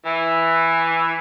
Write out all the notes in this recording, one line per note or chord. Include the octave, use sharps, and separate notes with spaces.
E3